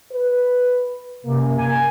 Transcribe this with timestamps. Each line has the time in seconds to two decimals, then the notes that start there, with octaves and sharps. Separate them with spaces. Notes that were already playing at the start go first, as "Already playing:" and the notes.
0.12 B4
1.26 F#2 C3 A#3
1.59 G#5